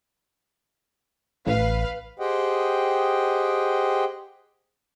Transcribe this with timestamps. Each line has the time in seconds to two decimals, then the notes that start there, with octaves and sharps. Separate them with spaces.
1.47 A1 B4 F5
2.19 G4 G#4 C5 D#5 F#5 G5